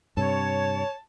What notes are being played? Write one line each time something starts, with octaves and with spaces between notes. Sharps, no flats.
G2 C3 C#5 A5